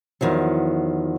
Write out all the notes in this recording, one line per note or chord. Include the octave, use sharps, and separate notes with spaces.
E2 D#3 F3 F#3